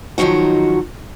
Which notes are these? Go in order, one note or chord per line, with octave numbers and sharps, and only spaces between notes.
D#3 F3 F#3 D#4 F#4